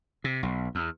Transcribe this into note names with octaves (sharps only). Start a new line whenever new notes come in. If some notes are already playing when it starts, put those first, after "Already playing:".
C3
B1
E2